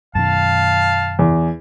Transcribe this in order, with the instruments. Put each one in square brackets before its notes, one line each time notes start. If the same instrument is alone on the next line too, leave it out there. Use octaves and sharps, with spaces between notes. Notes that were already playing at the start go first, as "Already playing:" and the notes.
[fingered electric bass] F#2 B2 D#3 [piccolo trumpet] F5 [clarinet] A5
[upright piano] E2